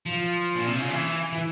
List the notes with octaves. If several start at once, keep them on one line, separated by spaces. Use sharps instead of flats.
F3
A#2
C3
C#3
E3
E3